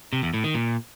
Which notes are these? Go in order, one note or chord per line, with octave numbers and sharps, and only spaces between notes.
C3
E2
A2
D#3
A#2